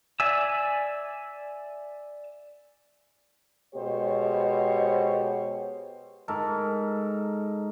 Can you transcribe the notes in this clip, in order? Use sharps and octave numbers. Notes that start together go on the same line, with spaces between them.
D5 E5 G#5 E6
B2 G#3 G4 C5 C#5
G#2 A4 A#4